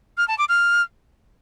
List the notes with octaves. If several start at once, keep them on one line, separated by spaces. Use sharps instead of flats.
F6
A5
D6
F6